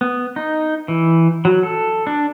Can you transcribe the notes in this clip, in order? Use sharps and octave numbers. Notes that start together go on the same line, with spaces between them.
B3
D#4
E3
F#3
A4
D4